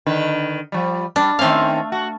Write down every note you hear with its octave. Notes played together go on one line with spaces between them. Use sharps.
D3 D#3 B4
F3 G3
G3 D4
D#3 A3 C4 C#4 F5
F#4